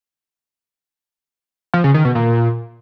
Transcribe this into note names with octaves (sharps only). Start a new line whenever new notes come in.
F3
C#3
D#3
B2
A#2